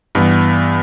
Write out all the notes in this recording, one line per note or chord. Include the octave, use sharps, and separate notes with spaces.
G2 E3 B3